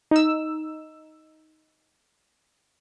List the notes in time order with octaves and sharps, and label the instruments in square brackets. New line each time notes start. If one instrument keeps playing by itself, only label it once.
[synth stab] D#4 E6